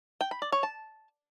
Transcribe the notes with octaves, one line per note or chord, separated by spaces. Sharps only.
G5
B5
D5
C#5
A5